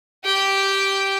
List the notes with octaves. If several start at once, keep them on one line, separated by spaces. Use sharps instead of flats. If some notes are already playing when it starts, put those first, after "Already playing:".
G4 G5